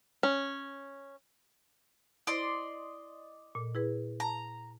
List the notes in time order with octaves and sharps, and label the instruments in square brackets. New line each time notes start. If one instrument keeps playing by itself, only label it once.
[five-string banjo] C#4
[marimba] E4 C5 [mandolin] D5 D#5 C6
[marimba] A#2 A4
E4 G#4 B4
[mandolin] A#5